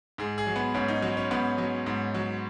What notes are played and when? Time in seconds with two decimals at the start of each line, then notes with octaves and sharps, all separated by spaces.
0.18 G#2 G#4
0.38 G#4
0.47 F#3
0.56 B3
0.74 G#2 C#4
0.88 D#4
1.02 F#3
1.17 C#4
1.31 G#2 B3
1.58 F#3
1.86 G#2
2.15 F#3